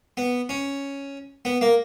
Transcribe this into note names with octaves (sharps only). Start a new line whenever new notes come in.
B3
C#4
B3
A#3